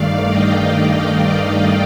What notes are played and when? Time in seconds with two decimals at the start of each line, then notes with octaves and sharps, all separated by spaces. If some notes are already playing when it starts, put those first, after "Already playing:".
Already playing: G2 D#3 A3 D5 F5
0.28 D#5 G5
0.72 D5 F5
1.16 D5 F5